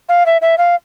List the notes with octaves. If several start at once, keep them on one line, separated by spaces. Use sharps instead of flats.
F5
E5
E5
F5